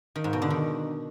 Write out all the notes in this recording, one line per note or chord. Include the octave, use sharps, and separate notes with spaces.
D#3
G#2
B2
D3
D#3